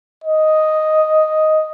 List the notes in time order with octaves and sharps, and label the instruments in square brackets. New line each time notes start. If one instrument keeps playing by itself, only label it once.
[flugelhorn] D#5